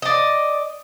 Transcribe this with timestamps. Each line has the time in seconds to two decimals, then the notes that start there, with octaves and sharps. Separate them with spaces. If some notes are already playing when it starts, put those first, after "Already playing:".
0.02 D5 D#5